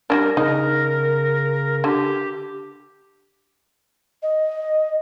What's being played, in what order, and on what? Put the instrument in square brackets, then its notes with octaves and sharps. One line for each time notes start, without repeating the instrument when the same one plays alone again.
[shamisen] G3 C#4 D4 [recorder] A#4
[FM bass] C#3 [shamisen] D#4 [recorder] A#4
[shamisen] D3 [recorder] G4
[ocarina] D#5